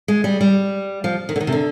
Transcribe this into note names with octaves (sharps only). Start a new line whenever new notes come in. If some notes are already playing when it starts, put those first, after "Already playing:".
G#3
G3
G3
F3
D#3
D3
D#3
C3
D3